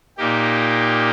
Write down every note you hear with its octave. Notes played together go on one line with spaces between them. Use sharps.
A#2 A#3 D#4 G4